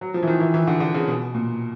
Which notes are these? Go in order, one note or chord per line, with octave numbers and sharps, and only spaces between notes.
F#3
F3
E3
D#3
E3
E3
D3
D3
C#3
B2
A#2